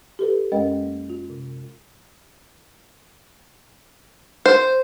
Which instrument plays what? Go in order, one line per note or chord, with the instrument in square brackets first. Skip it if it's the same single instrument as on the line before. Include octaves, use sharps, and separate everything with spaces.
[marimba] G4 A4 B4
F#2 G#3 C#4 A#4 D#5 G5
A#3
F4
C3
[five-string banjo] C5